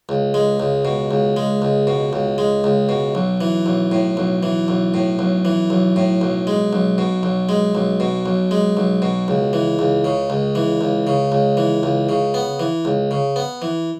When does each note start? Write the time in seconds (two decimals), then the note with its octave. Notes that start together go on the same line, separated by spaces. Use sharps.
0.09 C#2
0.34 G#3
0.60 C#2
0.85 B2
1.11 C#2
1.37 G#3
1.62 C#2
1.87 B2
2.13 C#2
2.38 G#3
2.64 C#2
2.89 B2
3.15 B1
3.41 E3
3.66 B1
3.92 A2
4.17 B1
4.43 E3
4.68 B1
4.94 A2
5.19 B1
5.45 E3
5.70 B1
5.96 A2
6.21 B1
6.47 G#3
6.73 B1
6.98 B2
7.23 B1
7.49 G#3
7.75 B1
8.00 B2
8.26 B1
8.51 G#3
8.77 B1
9.02 B2
9.28 C#2
9.53 E3
9.79 C#2
10.05 C#3
10.30 C#2
10.55 E3
10.81 C#2
11.07 C#3
11.32 C#2
11.57 E3
11.83 C#2
12.09 C#3
12.34 B3
12.60 E3
12.85 C#2
13.11 C#3
13.36 B3
13.62 E3